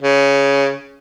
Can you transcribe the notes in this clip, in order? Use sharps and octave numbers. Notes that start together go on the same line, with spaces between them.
C#3